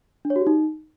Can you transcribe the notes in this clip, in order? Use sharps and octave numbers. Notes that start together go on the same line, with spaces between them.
D4
C#5
F#4
G4
D#4